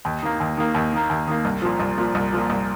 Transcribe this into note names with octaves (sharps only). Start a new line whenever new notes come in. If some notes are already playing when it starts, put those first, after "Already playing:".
D#2
D#3 A#3
D#2
D#3 A#3
D#2
D#3 A#3
D#2
D#3 A#3
C2
A#2 F3
C2
A#2 F3
C2
A#2 F3
C2